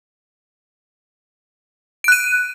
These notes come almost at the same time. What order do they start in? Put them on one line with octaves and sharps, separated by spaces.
D7 F#6 D#7